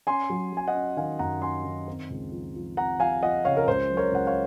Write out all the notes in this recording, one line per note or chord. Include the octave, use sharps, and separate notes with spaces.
C#4 G#5 C6
F#3
F#3 G#5
D#5 F#5
C#4
D#3 F5 G#5
F#2 F#5 A#5
C#4 G#5 C6
D#3
C4
C#2
F3
F3
C4 F#5 A#5
F3 F5 G#5
F3 D#5 F#5
C#3 C#5 F5
A#4
C#2 C5
F#3
A#4 C#5
C#2 F#5
C#5 F5